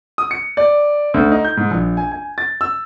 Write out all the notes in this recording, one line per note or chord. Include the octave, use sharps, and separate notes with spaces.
D#6
C#7
D5
D2
D#4
G6
G#2
A#1
G#5
G#5
A6
E6